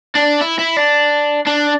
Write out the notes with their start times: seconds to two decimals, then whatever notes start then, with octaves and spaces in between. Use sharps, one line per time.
0.15 D4
0.41 E4
0.59 E4
0.77 D4
1.46 D4